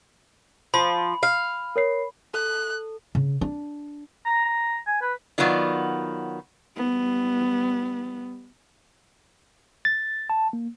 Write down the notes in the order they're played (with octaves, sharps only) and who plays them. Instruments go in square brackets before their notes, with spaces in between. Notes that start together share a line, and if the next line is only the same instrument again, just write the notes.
[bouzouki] F3 [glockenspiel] B5
[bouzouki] F5
[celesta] A#4 C#5 C7
[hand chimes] A4 [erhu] F#6
[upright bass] C#3
D4
[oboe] A#5
A#5
G#5
B4
[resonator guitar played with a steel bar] D#3 F#3 B3 F4 D5
[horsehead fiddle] G3 B3
[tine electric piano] A6
A5
A#3